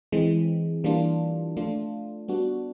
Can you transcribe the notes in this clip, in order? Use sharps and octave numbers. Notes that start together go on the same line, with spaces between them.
E3 G#3 C4
E3 G3 A#3 D4 F4
F3 A3 D4 F4
G3 B3 D4 F#4